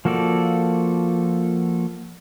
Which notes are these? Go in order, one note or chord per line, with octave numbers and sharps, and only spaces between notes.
F3 A#3 F#4 A4 D5